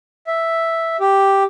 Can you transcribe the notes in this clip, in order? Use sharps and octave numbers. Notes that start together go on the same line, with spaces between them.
E5
G4